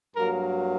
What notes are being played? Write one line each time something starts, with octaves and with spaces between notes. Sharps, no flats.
G2 F#3 A#3 A#4